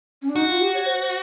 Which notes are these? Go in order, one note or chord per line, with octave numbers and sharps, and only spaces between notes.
C#4
D4
D#4 F#4
F4
G4
C#5
C5
C5